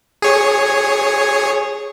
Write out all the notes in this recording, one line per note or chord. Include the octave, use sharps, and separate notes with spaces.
G#4 C#5